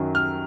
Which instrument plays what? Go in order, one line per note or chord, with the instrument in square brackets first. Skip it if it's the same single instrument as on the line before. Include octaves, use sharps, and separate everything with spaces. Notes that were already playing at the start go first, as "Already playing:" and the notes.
Already playing: [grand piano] F#2 D#3 F#3
F6